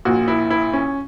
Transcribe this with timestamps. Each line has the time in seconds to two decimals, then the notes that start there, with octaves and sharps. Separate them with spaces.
0.05 A#1 A#2 F#4
0.28 E4
0.50 E4
0.73 C#4